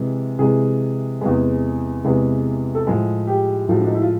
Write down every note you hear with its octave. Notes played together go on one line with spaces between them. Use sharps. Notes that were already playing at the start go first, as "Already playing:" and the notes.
Already playing: C3 E3 G#3
C3 E3 G#3 G#4
E2 C3 E3 G#3
E2 C3 E3 G#3
A4
A2 F3 G#3 G#4
G4
A2 F3 G#3 F#4
D4
D#4
E4
F4